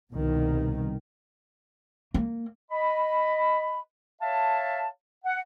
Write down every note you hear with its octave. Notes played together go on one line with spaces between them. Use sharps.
C2 B2 D#3
A#3
D#5 B5
C#5 E5 F5 A5
F#5